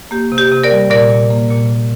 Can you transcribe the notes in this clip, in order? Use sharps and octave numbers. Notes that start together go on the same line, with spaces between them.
A#3 G4
C3
G4
C3
A#4 D5
G3
A#2 A#4 D5
A#2
A#3
A#2
A#2